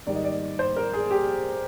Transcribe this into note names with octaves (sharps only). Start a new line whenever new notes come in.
G#2 D#3 G3 D5
D#5
D5
C5
A#4
G#4
G4